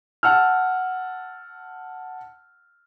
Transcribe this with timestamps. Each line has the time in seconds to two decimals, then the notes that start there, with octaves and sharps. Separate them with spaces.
0.23 F#5 A5 E6 F6